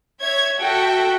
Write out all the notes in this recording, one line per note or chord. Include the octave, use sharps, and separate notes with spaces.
C#5 E5 G#6
F#4 A4 E5 F#5 G5